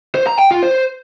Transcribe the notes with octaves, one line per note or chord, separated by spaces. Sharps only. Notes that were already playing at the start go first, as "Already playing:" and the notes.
C5
A#5
G5
F4
C5